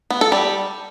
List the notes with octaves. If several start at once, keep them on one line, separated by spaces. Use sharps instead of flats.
B3
A4
G3